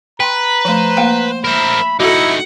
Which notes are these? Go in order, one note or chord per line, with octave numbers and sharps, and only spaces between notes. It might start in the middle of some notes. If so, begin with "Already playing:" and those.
B4 G5 A#5 C6
F3 A3 C5
A#3 F5 G5
C4 A#4 E5 B5
A3 D#4 E4 F#4 A4 F#5